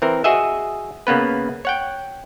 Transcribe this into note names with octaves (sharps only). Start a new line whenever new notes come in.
E3 C4 A#4
F#4 G#4 D#5 E5
C#3 A#3 B3 B4
C#5 F#5 G5